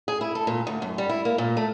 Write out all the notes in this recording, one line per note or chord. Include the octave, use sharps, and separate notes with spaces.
G#4
E4
A4
A#2
D2
F#2
G3
E4
A#3
A#2
A3